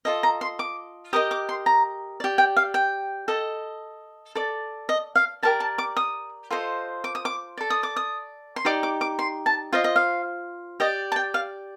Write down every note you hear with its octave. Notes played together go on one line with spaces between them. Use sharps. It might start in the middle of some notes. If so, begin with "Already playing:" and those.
F4 A4 D#5
A#5
C6
D6
G4 A#4 D#5 D#6
D6
C6
A#5
G4 D5
G5
F5
G5
A4 D#5
A4 D5
D#5
F5
G4 A#4 D5 A5
A5
D6
D#6
F4 A4 C5 D#5
D6
D#6
D6
A4 D5
D#6
D6
D#6
C6
D#4 G4 D5 D6
D6
D6
C6
A5
F4 C5 D#5 F5
D#5
F5
G4 D5 D#5
A5
G5
F5